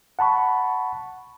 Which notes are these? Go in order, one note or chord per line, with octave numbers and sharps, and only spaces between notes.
F#5 A5 B5 C#6